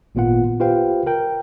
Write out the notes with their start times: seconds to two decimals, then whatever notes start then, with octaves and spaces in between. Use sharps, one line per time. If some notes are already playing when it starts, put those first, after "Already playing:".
0.15 G#1 A#2 B3 F4 F#5
0.60 F4 G4 B4 C5 F5 G5
1.07 A#4 G5